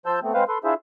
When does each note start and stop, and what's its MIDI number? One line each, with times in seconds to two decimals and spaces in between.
0.06 0.19 53
0.06 0.19 72
0.06 0.19 81
0.06 0.19 88
0.06 0.19 91
0.23 0.33 57
0.23 0.33 59
0.23 0.33 60
0.34 0.44 56
0.34 0.44 60
0.34 0.44 71
0.34 0.44 72
0.34 0.44 77
0.48 0.58 69
0.48 0.58 71
0.48 0.58 84
0.64 0.74 62
0.64 0.74 64
0.64 0.74 65
0.64 0.74 68
0.64 0.74 72
0.64 0.74 76